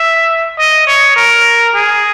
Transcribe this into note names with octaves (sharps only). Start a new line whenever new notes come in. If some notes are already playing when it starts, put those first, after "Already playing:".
Already playing: E5
D#5
C#5
A#4
G#4